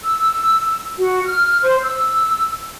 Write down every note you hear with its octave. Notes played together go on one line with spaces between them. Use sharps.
E6
F#4
F6
C5
E6